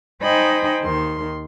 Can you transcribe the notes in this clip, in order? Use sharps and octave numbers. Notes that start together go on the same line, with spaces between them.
D#4 C5 D#5 G5 G#5 B5
D#2 D#3 C6